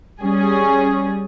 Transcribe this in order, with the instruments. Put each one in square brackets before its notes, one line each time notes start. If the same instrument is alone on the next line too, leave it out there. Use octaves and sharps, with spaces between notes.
[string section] G3 C#4 G#4